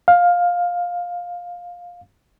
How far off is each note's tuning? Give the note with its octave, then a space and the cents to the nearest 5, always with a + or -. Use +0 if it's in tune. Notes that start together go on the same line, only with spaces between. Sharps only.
F5 +15